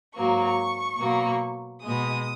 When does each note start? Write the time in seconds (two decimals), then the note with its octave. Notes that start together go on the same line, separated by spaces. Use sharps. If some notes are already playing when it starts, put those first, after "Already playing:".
0.15 G#2 F#3 A#3 C#6
0.98 B2 F#3 A#3
1.82 B2 G#3 D#6